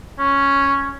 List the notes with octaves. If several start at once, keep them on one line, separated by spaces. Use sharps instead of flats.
C#4